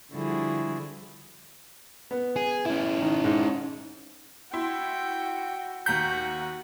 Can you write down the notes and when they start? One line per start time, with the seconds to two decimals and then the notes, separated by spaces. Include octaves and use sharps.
0.14 D3 F3 G3 E4 F#4 G#4
2.11 B3
2.36 G#4
2.66 C#4 E4
3.02 D#3
3.24 G#2
4.53 E4 F#4 G5 C6
5.86 D#2 F#4 F#5 A#5 G6 B6